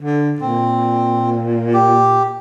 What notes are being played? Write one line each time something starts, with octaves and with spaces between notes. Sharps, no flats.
D3
A#2 C4
G4